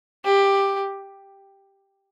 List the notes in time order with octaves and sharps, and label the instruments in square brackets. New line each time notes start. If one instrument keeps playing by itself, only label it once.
[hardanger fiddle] G4